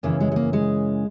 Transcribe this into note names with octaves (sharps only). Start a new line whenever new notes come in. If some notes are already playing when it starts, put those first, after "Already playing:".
F#2 C#3 E3 A#3
G#3
G#3
A#3
G#3